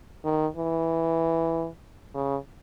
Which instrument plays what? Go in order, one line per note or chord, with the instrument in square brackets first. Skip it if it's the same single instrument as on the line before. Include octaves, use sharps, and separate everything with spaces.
[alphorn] D#3
E3
C#3